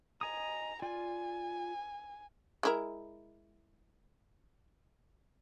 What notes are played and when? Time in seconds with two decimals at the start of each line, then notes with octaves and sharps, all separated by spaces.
0.21 D#5 G#5 A#5 D#6
0.82 F4 D5 G#5
2.63 G#3 E4 A#4